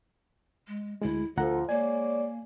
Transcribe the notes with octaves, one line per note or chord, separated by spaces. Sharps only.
G#3
D2 G#3 E4
D2 F3 A4 F#5 A#5
G#3 A#3 C#5 D5 G#5